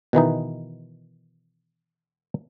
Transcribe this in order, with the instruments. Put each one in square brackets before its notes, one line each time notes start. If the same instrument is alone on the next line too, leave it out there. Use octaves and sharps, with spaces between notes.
[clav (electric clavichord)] B2 D#3 E3 D#4